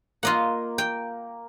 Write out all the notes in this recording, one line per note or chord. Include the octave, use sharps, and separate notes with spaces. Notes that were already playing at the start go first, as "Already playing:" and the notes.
A#3 F4 D#5 F#5
G5